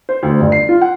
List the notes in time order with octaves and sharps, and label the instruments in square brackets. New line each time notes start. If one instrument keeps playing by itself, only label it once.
[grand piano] C5
D2
G1
C7
F4
F#5